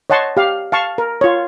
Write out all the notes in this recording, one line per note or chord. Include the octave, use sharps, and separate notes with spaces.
C#5 D#5 F#5 A5 C6 C#6
G4 F5
F5 A5 C#6
A#4
F4 C#5